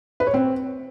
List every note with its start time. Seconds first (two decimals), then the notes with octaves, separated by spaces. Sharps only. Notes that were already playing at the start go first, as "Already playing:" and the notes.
0.20 B4
0.27 C#5
0.34 C4